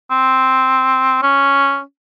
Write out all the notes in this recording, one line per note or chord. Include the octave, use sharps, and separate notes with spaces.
C4
C#4